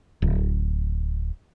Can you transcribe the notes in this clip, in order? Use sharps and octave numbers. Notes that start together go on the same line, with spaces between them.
D1